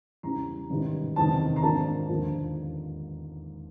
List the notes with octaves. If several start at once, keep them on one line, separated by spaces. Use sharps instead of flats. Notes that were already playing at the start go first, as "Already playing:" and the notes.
E2 C#3 E3 G3 A#5
A1 G#2 D#3 G3
F#1 E2 C3 D#3 A5
A#5
G#1 G#2 F3 A#3 D4 A5
E1 D#2 D3 F3 A#3